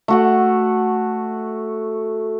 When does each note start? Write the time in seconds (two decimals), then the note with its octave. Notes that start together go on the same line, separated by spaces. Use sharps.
0.08 A3 F#4 F#5